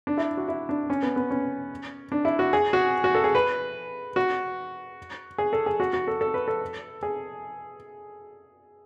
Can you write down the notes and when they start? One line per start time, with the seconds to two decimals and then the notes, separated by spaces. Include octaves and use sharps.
0.07 D4
0.17 E4
0.37 F#4
0.48 E4
0.69 D4
0.90 C#4
1.02 B3
1.16 B3
1.31 C#4
2.12 D4
2.25 E4
2.39 F#4
2.53 G#4
2.73 F#4
3.04 F#4
3.15 A4
3.24 G#4
3.35 B4
4.16 F#4
5.38 G#4
5.53 A4
5.66 G#4
5.80 F#4
5.93 F#4
6.08 A4
6.21 A4
6.34 B4
6.48 A4
7.03 G#4